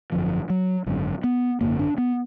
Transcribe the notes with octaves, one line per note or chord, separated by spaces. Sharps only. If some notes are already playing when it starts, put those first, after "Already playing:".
G#1 F#2 D3 F3
F#3
G#1 F#2 D3
B3
G#1 F#2 D3 A#3
D4
B3